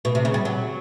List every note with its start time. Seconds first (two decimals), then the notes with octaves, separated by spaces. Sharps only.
0.05 B2
0.15 C3
0.25 C#3
0.34 G3
0.45 F#3